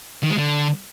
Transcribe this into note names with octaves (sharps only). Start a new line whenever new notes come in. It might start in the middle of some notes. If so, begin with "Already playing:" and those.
D#3
G#3
D3